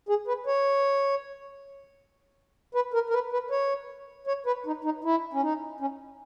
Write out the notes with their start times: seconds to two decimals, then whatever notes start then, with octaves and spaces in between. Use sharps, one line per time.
0.09 G#4
0.27 B4
0.46 C#5
2.75 B4
2.94 A#4
3.09 A#4
3.13 B4
3.32 B4
3.51 C#5
4.27 C#5
4.46 B4
4.66 D#4
4.84 D#4
5.04 E4
5.33 C#4
5.42 D#4
5.80 C#4